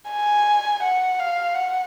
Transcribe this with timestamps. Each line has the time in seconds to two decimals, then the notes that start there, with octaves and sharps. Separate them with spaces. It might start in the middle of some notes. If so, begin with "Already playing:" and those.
0.10 G#5
0.83 F#5
1.20 F5
1.55 F#5